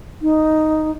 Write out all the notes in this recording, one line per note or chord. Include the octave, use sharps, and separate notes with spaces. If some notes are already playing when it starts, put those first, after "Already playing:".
D#4